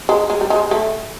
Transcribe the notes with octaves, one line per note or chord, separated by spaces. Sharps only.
G#3
G#3
G3
G#3
A3